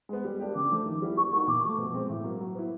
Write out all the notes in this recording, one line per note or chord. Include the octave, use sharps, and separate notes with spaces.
G#3 B3
G3
A#3 D4 G4
C#3 D6
F3 A3
D#3
G3 B3 E4
G3 C#6
A#3 D#4 F#4 C#6
A#2 D6
F3 A3
B2
G#3 C4
A2
F#3 A#3
F#3
B3 E4